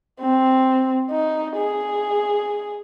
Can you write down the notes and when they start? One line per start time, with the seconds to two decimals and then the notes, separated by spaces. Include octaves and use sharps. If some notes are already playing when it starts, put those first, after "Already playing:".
0.20 C4
1.11 D#4
1.56 G#4